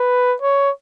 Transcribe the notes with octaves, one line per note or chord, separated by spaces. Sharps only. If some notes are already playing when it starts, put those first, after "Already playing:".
Already playing: B4
C#5